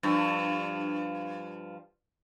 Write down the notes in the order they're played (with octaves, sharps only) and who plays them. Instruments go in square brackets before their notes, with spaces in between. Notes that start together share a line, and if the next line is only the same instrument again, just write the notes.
[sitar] G2 F3